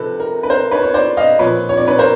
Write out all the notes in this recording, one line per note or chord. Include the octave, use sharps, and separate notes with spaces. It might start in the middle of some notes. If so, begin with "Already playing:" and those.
Already playing: C3 F3 A4 B4
A#4
B4
A#4 C5
B4 C#5
C#5
C5 D5
D#5 F5
A#2 F3 B4 C#5
C#5
D5
B4 C#5
A#4 C5